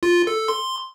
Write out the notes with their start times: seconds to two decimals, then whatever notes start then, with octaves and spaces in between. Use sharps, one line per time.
0.03 F4
0.27 A4
0.48 C6